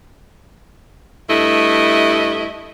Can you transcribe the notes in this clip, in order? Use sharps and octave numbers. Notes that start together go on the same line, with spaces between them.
G2 A3 E4 D#5